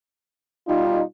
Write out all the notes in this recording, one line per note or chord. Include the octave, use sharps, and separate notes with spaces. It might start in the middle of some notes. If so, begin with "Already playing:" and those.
B2 G3 D#4 F4